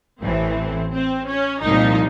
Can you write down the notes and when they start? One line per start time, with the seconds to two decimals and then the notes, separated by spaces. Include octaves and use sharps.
0.21 A1 A2 E3 C4
0.92 C4
1.28 C#4
1.63 C2 A#2 F3 D#4